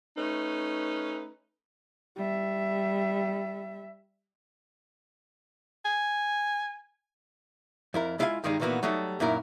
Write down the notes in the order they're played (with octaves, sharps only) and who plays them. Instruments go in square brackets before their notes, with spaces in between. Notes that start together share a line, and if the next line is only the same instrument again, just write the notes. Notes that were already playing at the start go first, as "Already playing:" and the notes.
[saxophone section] A3 C#4 D#4 B4
[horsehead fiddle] G3 E5
[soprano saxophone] G#5
[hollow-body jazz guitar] F2 E4 A#4
G#3 E4 F4 F5 G5 G#5
G2 D#3 G3 G#3 B3 D#4
A#2 D#3 E3 A#3 B3 F#4
F#3 G3 A3 D#4 A4
F#2 A#2 D#4 E4 A#4